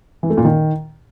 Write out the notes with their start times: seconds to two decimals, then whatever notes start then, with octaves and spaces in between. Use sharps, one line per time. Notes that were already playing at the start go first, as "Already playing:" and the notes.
0.23 E3
0.30 A3
0.37 A#2
0.45 D#3